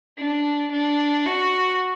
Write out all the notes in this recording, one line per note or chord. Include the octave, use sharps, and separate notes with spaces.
D4
D4
F#4